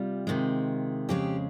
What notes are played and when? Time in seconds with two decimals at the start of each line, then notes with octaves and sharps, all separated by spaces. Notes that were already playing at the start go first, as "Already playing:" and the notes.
Already playing: C3 G3 F4
0.27 C3 D#3 G#3
1.09 F2 C#3 G#3 G4